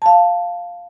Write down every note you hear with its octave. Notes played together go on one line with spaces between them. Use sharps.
F5 A5